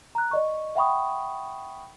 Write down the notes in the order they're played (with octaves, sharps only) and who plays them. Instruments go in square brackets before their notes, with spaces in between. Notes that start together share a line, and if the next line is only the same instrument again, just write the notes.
[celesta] A#5 F#6
D5 D#5 C#6
E5 F#5 G5 B5 C#6 D#6